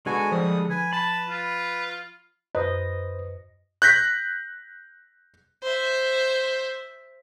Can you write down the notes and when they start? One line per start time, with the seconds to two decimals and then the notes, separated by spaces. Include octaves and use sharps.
0.06 D3 G#3 B3 F#4 A4 G#5
0.32 F3 G3 D#6
0.70 B4 G#5
0.93 A5 B5
1.29 F4
2.55 F#2 B4 C5 D#5 D#6
3.82 F#6 G6 A#6 B6
5.62 C5 E5